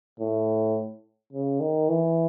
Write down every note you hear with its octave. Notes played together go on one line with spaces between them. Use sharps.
A2
C#3
D#3
E3